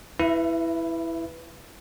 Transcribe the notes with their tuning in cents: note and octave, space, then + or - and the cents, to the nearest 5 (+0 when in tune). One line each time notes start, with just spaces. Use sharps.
E4 +0 B4 +0 E5 +35